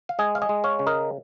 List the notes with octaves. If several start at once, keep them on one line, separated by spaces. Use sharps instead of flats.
F5
G#3 D#5 G#5
F5
D#5 G#5
G#3
C#5 F5
C#3
A#4 D#5